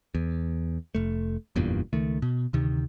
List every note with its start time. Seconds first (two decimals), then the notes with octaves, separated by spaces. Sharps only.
0.15 E2
0.95 F1 A3
1.56 F#1 E2 G2 A#2
1.93 C#2 D#3 A3
2.22 B2
2.53 D2 C3 D#3